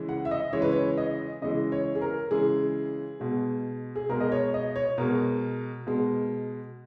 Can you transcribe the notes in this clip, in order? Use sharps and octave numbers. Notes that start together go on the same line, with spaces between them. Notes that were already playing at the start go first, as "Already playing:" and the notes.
Already playing: C#3 E3 G#3
F#5
E5
D#5
C#3 E3 G#3 C#5
B4
C#5
D#5
C#3 E3 G#3 D#5
C#5
G#4
A#4
C#3 E3 G#3 G#4
B2 G#3
G#4
B2 G#3 A#4
D#5
C#5
D#5
C#5
B2 G#3 A#4
B2 G#3